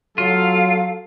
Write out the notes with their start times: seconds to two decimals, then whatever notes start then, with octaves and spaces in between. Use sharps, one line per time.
0.18 F#3 F4 A4 F5